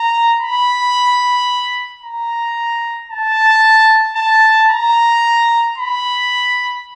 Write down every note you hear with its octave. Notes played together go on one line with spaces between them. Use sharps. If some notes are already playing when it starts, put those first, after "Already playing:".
Already playing: A#5
B5
A#5
A5
A5
A#5
B5